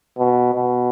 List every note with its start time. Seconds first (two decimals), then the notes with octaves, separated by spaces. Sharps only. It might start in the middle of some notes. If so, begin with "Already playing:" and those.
0.18 B2
0.55 B2